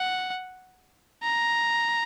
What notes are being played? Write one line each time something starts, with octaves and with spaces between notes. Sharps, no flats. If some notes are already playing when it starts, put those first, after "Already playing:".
Already playing: F#5
A#5